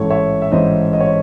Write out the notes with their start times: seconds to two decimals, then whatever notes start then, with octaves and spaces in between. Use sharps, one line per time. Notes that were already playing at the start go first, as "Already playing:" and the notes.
Already playing: A1 G#2 E3 A4 C#5
0.10 C#5 E5
0.42 E5
0.52 A1 G#2 E3 C5 D#5
0.93 D#5
1.00 C#5